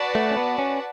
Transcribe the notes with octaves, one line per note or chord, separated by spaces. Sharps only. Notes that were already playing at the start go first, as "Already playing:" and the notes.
Already playing: F#4 B4 D5 F#5 A5
A3
C#4
B3
C#4